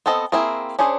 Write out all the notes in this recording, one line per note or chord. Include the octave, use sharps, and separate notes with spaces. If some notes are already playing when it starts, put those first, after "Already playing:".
B3 C4 A4 D#5
A#3 C4 E4 G#4 A#4
C#4 D4 G#4 C5 C#5